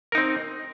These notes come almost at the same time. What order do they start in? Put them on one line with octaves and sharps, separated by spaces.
A#4 D#4 C4